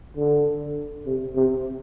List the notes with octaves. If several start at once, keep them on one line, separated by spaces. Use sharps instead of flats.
D3
C3
C3